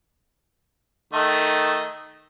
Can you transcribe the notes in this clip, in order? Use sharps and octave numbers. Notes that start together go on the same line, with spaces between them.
D#3 A3 D#5